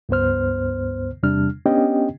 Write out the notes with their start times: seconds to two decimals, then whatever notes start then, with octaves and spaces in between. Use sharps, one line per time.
0.09 C#2 G2 B3 C5 F6
1.23 E2 C3 G3 D4 F6
1.66 B3 C#4 D4 G4 D#5 G5